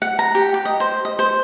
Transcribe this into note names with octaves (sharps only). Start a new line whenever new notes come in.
F#5
A#5
G4
G4
D#5
C5
D#5
C5